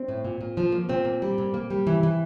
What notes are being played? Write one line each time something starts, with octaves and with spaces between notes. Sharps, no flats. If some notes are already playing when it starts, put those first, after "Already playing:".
Already playing: C4
A2
A#2
A#2
F3
A#3
A#2 C4
A#3
G3
A#2
A#3
G3
E3
E3